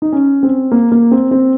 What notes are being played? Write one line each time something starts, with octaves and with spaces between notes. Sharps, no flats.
D#4
C#4
C4
A#3
A#3
C4
C4